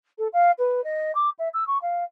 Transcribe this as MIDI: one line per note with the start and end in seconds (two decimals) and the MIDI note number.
0.18 0.27 69
0.33 0.51 77
0.58 0.83 71
0.84 1.11 75
1.15 1.29 86
1.38 1.48 76
1.53 1.64 88
1.67 1.78 85
1.82 2.04 77